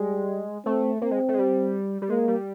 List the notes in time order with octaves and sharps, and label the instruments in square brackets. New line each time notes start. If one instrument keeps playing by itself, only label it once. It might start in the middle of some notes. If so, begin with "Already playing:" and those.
Already playing: [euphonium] G3 [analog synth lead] G#3
[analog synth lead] A3 [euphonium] C4
[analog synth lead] A#3 [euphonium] C4
[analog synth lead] G#3
A3
G#3
G3
G3
[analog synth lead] G#3 [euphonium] A#3
[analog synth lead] G3